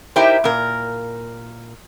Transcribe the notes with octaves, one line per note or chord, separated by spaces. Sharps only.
D#4 E4 G4 A#4 C5
A#2 A#4